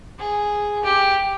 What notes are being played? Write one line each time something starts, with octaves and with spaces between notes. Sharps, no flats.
G#4
G4